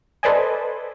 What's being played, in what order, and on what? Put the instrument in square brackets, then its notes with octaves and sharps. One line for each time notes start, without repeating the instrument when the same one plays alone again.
[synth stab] A4 B4 C5 D5 D#5 G#5